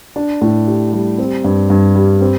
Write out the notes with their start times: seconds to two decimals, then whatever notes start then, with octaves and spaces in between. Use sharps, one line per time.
0.16 D4
0.41 A2
0.67 G4
0.93 G3
1.18 C4
1.44 G2
1.70 G2
1.95 G3
2.21 C4